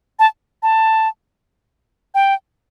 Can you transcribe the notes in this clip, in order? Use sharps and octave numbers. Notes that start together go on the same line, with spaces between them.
A5
A5
G5